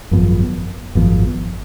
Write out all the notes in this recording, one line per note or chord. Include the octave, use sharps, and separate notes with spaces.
G#1 F#2 F3 B3
G#1 F#2 F3 B3